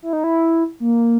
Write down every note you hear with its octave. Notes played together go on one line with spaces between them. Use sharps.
E4
D#4
E4
A#3